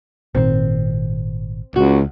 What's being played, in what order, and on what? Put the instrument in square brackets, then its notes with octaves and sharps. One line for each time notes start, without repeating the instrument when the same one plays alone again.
[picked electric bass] G#1 A#2 D#3 [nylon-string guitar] C4
[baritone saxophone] C#2 [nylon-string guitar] F#4